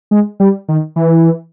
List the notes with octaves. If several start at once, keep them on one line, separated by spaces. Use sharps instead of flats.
G#3
G3
D#3
E3